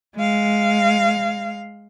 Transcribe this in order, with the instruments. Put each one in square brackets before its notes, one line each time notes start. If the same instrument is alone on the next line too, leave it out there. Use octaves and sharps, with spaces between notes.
[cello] G#3 F5